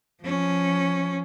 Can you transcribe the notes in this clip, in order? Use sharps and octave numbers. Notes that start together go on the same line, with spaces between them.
F3 C#4